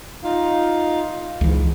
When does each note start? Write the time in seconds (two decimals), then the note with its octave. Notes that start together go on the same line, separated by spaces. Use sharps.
0.24 D#4 F4 F5
1.41 C#2 G#2 E3